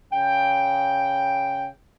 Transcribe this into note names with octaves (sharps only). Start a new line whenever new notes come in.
C#3 G5